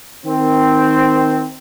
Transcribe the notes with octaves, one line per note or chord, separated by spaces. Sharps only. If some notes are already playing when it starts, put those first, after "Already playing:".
D#3 C4